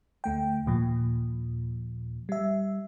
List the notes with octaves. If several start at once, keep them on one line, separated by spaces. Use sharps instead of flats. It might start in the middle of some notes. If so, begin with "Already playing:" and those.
D2 A3 G5
D#2 A#2 F3
G3 E5